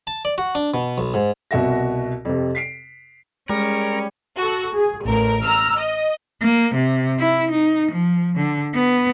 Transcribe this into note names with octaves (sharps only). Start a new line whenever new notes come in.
A5
D5
F#4
D4
B2
B1
G#2
C2 B2 F#4 E5 A#6
F2 C3
B6 C7 D7
G3 G#3 C#4 A#4
F#4 A4
G#4
A1 A#4
A#5 E6 F6
D#5
A#3
C3
E4
D#4
F3
D3
B3